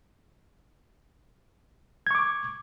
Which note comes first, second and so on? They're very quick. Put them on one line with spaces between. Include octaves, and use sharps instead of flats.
G#6 C#6 D6